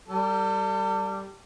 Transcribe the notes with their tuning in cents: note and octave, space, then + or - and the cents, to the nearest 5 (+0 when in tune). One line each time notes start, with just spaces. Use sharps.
G3 -5 A4 +35